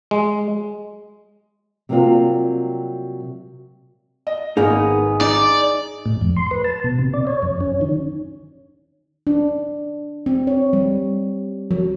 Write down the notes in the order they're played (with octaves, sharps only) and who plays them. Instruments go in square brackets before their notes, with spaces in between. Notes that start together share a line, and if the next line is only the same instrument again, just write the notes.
[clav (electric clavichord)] G#3
[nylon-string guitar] C3 F#3 G3 A#3 C4 F4
[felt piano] D#5
[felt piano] G#1 [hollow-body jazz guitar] A#3 B3 D#4 [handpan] G#4
[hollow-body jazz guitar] D#4 [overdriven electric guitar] D5
[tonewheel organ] A2
F2
C6
B4
A5
B2
C3
D5
C#5
F#2
C#4
D#3
[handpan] D4
C4
C#5
G3
F#3